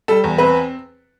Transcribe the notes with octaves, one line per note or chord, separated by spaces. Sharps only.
G3 A4
E2
C4 B4